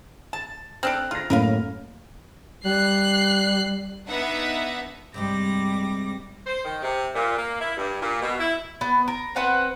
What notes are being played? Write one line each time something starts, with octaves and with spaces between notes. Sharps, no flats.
A5 A6
C4 D4 A4 F6 F#6 D7
F4 F6 A#6
F#2 A2 A#3 A#4 B4 F5
G3 F#6 C7
B3 D4 D#4 E5 F#5
G2 C3 G3 G#3 D6 A#6
C5
D#3
C3
A#2
A#3
E4
G2
A#2
B2
E4
B3
A#4
C4 B4 F#5 A5